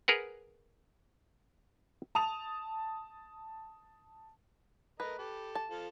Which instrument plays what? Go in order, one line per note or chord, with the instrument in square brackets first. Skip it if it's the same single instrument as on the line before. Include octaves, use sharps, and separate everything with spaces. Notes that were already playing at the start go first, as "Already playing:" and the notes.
[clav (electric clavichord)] G#4 A#4 B4 F#5
[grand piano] A5 D#6 F7
[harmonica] A3 A#4 D#5 [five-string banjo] B4
[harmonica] G4 A4
[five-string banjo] A5
[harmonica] F3 A4 F5